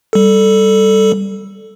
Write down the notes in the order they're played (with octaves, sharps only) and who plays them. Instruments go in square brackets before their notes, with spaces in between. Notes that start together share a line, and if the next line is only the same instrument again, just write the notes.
[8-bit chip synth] G3 A4